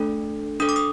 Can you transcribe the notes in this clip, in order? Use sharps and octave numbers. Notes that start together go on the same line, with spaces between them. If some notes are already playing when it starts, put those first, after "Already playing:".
Already playing: A3 D4 A4
D4 A4 D#6
D6
D#6